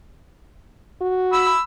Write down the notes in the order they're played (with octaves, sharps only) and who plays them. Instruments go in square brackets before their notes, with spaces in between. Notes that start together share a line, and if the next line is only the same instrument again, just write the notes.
[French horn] F#4
[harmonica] B5 E6